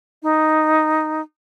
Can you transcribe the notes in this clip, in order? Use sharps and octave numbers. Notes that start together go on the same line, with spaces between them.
D#4